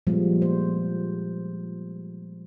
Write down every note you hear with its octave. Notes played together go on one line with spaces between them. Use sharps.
A#2 F3 G3 G#3 B3
C5